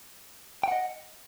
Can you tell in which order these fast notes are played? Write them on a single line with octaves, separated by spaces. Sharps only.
G5 F#5 D#5